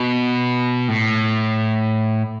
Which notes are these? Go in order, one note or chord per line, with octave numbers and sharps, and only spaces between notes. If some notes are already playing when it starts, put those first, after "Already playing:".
Already playing: B2
A2